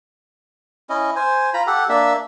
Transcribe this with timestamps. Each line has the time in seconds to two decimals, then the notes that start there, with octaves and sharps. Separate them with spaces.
0.90 C#4 E4 D#5
1.16 C5 G#5
1.54 F4 A#5 B5
1.67 G4 A4 F#5
1.89 A#3 D4 E5